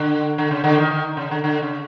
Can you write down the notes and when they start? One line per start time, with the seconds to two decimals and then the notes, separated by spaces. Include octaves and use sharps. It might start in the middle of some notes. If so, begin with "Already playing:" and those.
Already playing: D3
0.38 D3
0.51 C#3
0.64 D3
0.78 D#3
0.91 D#3
1.17 C#3
1.31 D3
1.44 D3
1.62 C#3